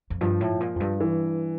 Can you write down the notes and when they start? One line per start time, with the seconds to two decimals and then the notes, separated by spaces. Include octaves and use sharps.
0.10 F2
0.21 G2 F3
0.41 A2
0.60 A#2
0.76 F2
0.80 G2
1.00 E3